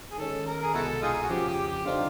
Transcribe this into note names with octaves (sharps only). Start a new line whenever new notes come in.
G#4
D#3 G#3 C#4 A4
A#4
G#4
C2 B2 G#3 E4 F#4 A4
D#4 F4 G#4
F#4
F2 C#3 F3 G4
G4
G4
D3 G3 C4 D#4 F4